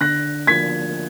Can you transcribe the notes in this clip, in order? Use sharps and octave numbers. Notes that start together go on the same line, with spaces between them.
D3 F#6 A#6
F3 A#3 G#6 B6